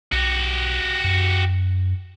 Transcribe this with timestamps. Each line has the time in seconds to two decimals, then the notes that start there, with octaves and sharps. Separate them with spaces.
0.12 B1 F#4 G4
1.04 F#2